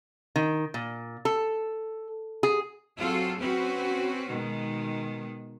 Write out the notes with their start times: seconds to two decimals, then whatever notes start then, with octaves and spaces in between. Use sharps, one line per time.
0.36 D#3
0.74 A#2
1.25 A4
2.43 G#4
2.97 F#3 C4 F4 F#4 G#4 A4
3.39 C4 C#4 F#4 B4
4.31 B2 D#3 G#3